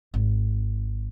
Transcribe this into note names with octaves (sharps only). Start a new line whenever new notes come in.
G#1